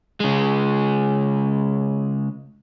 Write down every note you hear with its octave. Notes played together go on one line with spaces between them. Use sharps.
C#3 G#3